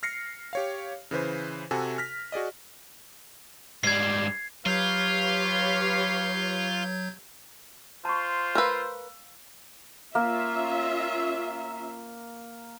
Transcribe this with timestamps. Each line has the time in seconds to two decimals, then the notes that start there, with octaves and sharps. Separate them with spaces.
0.03 F6 A#6 C7 C#7
0.53 G4 C#5 F5
1.11 C#3 E3 B4 C5
1.71 C3 F#4 A4 G#5
1.98 F6 A#6 B6
2.32 F#4 G#4 D5 D#5
3.83 G#2 G3 G#6 C7
4.66 F#3 F4 G4 B4 C#5 F5 G6 G#6
8.05 F4 C5 A5 C#6
8.55 A#4 B4 F5 E6
10.15 A#3 C#4 F4 E5